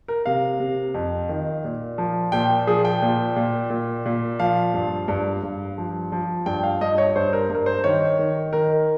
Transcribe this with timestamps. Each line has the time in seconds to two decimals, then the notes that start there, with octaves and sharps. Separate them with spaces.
0.08 A#4
0.26 C3 F5
0.60 C3
0.94 F2
1.29 D#3
1.64 A#2
1.98 F3
2.32 A#2 G5
2.67 F3 G#4
2.85 G5
3.02 A#2
3.36 A#2
3.70 A#2
4.06 A#2
4.39 F3 F5
4.74 G2
5.08 G2
5.43 G2
5.78 F3
6.12 F3
6.46 G2 G5
6.63 F5
6.81 G2 D#5
6.98 C#5
7.16 G2 C5
7.33 A#4
7.49 G2
7.55 A#4
7.66 C5
7.84 D#3 C#5
8.19 D#3
8.53 D#3 A#4